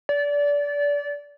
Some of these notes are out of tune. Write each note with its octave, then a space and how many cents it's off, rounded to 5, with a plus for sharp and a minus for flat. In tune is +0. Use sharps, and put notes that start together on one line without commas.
D5 -25